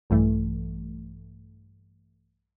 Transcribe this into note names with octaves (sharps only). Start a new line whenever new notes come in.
A#1 G2 E3 A3